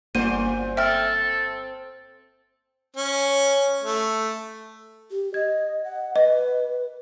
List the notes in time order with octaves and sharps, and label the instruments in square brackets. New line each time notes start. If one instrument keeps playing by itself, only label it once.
[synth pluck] G1 A#3 F#5 [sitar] F#2 A#2 C5 [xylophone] D#7
[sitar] C4 [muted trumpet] A4 [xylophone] E5 G5 F6
[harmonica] C#4
A3
[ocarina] G4
[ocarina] D#5 [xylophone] G#6
[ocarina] F#5
[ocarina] B4 [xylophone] D#5